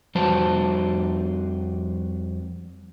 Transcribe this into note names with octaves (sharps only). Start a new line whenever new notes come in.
F2 G3 F#4 C5 A5